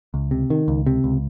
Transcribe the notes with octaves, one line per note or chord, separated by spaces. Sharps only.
C#2
C3
D#3
C#2
C3
C#2